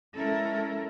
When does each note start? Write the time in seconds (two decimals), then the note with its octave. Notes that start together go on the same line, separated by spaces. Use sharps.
0.17 G#3 C#4 E4 A4 A#4